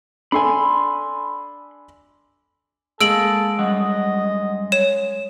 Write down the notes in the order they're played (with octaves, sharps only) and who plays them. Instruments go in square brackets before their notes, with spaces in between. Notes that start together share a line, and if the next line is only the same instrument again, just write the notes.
[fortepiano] D4 A4 G#5 [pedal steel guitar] B5 C6
[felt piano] G#3 [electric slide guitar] A#3 [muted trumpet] A4 [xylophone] E6 D7 F#7
[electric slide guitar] F#2 G3 F#5 [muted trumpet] D#5
[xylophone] C#5 E7